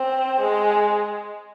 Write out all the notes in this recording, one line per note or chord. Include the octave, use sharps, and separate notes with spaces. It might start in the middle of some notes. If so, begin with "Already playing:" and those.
Already playing: C4
G#3